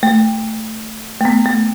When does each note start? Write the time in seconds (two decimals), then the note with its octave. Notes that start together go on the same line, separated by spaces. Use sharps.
0.03 A3
1.21 A3
1.25 B3
1.46 A3